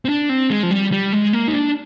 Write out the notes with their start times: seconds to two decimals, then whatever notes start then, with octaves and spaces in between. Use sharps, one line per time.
0.05 C4
0.09 D4
0.29 C4
0.50 G#3
0.63 F3
0.71 G3
0.92 G3
1.13 G#3
1.33 A#3
1.48 D#4
1.53 D4